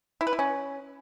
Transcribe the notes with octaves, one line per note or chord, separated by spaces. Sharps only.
E4
B4
E4
C#4